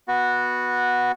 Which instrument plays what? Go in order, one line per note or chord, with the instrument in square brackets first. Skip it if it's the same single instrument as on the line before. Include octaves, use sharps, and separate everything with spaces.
[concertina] B3 F#4